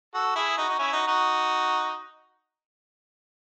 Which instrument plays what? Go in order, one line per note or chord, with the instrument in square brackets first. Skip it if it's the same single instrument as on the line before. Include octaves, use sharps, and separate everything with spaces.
[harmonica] F#4 A4
E4 G#4
D#4 F#4
D#4
C#4 E4
D#4 F#4
D#4 F#4